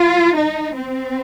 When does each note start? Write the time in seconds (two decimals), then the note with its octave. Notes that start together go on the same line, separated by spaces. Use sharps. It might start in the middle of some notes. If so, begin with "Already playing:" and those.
Already playing: F4
0.35 D#4
0.74 C4